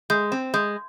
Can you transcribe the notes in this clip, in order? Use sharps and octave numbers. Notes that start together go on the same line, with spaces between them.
G#3 G6
C4
G#3 G6